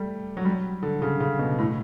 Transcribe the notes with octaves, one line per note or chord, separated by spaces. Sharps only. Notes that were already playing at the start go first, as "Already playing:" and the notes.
Already playing: G3 A3
F#3
G3
D3
C#3
C#3
B2
A2